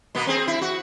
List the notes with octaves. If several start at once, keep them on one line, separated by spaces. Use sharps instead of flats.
B2 A#3 B3
C4 G#4
E4
F#4